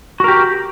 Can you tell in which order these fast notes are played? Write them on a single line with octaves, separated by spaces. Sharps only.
F#4 A#4 G4